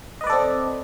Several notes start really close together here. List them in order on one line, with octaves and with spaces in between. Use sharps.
D#5 B4 D5 A4 C4